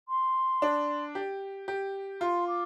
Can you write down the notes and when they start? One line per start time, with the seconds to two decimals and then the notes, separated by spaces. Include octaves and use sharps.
0.08 C6
0.62 D4
1.15 G4
1.68 G4
2.21 F4 C6
2.47 D6